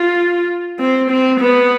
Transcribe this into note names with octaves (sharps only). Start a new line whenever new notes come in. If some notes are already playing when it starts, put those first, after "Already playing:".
Already playing: F4
C4
C4
B3